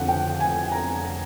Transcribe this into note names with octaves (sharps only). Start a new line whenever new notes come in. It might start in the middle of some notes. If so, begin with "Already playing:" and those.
Already playing: F2 D3 F#5
G5
G#5
A#5